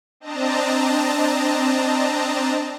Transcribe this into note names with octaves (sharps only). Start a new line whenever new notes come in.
C4 D4 D#5 A5 A#5